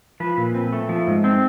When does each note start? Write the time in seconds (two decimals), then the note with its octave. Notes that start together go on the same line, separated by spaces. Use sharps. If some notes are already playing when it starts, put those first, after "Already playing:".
0.20 F3 B4
0.37 A#2
0.55 C4
0.73 A3
0.89 F3
1.07 G#2
1.24 C4